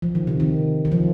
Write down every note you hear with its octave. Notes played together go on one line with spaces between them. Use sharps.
F3
D#3
C3
D#3
D#3
F3